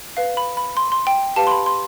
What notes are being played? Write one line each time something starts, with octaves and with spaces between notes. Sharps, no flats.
B4 F5
B5
B5
C6
C6
G5
G4 B4 F5 A5
C6
B5
C6